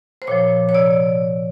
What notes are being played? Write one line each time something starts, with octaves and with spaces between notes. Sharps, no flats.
C5
A#2 F3 C#5
C#5
C3 D5